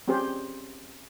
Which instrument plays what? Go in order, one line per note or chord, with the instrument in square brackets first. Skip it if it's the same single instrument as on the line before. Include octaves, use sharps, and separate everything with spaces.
[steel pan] C4 C#4 G4 G#4 C5